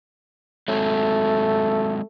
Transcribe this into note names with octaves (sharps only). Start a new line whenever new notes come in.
F#3 G#3 A3 C4